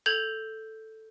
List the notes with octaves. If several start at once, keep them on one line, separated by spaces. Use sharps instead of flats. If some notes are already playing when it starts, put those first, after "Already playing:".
A4 G6 G#6 F7 F#7